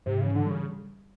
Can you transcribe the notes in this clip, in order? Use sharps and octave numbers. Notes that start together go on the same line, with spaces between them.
G#2 C3
C#3 E3
D3
C#3 G3